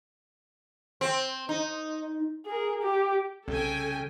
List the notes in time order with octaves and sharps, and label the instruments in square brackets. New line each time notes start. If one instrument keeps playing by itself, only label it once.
[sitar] C4
D#4
[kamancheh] G#4 A#4
G4
[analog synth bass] C2 [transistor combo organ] C#3 [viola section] A4 G5 G#5